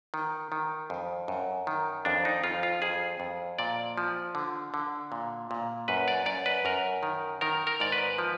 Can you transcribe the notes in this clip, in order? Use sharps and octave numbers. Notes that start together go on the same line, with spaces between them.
D#3
D#3
F2
F#2
D#3
F2 D4
D#4
F2 F4
F4
F2 G#4
F2
A#2 D5
F3
D3
D3
A#2
A#2
F#2 B4
D5
F#2 D5
B4
F#2 A#4
D#3
D#3 A#4
A#4
G#2 D5
B4
F3